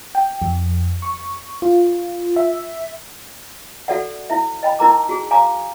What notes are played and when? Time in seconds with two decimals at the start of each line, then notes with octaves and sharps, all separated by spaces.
0.15 G5
0.42 F2
1.02 C#6
1.62 F4
2.36 E5
3.88 F#4 A4 D5 E5 F#5
4.30 E4 E5
4.63 D#5 G5 B5
4.79 D#4 E4 A#4 A#5 D6
5.09 F#4 G#4
5.31 F5 G#5 A#5 C6 D6